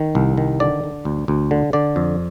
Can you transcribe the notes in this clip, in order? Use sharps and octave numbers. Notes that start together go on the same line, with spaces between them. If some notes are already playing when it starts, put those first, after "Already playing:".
Already playing: D#3
C2
D#3
D3 D5
D3
D2
D2
D3
D3 D5
F2